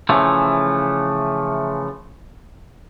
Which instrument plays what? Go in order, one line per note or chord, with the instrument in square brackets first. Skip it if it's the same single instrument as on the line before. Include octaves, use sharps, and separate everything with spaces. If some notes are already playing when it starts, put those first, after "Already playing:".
[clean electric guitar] C#3 E3 F3 A3